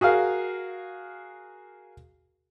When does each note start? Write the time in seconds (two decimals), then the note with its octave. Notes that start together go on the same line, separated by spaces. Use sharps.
0.01 F#4 G#4 A#4 F5